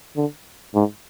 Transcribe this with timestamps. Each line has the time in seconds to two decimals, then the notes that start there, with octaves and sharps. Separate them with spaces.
0.16 D3
0.74 G#2